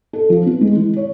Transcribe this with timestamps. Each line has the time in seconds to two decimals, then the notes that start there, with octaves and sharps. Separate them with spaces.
0.13 A4
0.30 F3
0.46 B3
0.61 G#3
0.76 E3
0.97 C#5